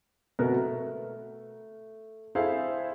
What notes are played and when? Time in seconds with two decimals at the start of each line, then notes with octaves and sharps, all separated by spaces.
0.39 B2 A3 B3 F#4 A#4
0.55 A3
2.35 E4 G#4 A4 C5 F5